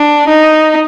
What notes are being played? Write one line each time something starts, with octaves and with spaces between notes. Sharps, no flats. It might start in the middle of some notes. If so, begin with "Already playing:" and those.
Already playing: D4
D#4